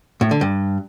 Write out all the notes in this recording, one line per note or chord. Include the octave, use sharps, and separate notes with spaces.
A2
D3
G2